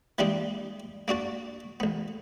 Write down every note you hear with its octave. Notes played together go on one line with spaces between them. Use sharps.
E3 G3 G#3 A#3 D4 D#4
A#3 D4 F#4 A5
A1 B3